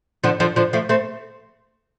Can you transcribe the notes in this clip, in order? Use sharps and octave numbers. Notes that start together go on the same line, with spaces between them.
D3 F3
D3 F3
D3 F3
F3 A3
A3 C4